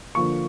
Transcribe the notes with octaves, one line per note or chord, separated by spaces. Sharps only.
D3 F3 A#3 C#6